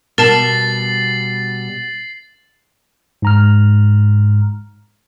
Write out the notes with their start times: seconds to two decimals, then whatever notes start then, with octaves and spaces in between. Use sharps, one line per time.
0.18 B2 G3 A#4 A5 A6 C7 F#7
3.22 G#2 A#5 F6